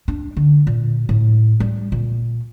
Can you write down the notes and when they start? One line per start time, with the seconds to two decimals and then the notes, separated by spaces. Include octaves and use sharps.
0.08 D4
0.37 D3
0.67 A#2
1.09 A2
1.60 G3
1.92 A#2